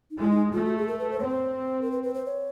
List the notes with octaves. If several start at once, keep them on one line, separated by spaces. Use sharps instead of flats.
D#4
G#3 E4
D#4
A3 F4
F#4
G#4
A#4
B4
C5
C4 C#5
C5
A#4
B4
B4
C5
C#5